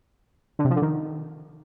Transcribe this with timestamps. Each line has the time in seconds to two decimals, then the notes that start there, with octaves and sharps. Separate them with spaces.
0.59 D3
0.65 C3
0.70 F3
0.76 D3
0.82 D#3